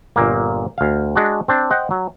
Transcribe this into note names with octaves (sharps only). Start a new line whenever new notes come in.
G1 A#2 A#3
D2 F5
G#3 D4 F#4
C4 D4
C5 D#5 F#5 G5
F#3